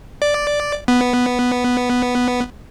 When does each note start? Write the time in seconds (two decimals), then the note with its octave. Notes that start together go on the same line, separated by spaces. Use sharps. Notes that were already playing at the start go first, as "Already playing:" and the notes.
0.22 D5
0.88 B3